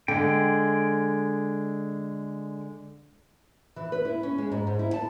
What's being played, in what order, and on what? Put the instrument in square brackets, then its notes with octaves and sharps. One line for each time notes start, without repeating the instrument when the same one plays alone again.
[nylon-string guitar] D3 [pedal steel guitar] G#3 G5
[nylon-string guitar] E3
B4
E4
C#4
G#3
G#2
G#2
E4
A5